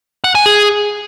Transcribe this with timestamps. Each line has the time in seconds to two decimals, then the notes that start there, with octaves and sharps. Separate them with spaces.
0.24 F#5
0.35 G#5
0.46 G#4